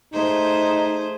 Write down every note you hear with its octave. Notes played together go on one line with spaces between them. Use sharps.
A3 D#4 G#4 C5